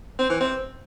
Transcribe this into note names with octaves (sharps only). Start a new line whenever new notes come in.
C4
E3
C4